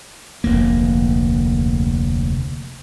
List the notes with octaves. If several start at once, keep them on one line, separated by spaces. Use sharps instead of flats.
F1 D2 A#3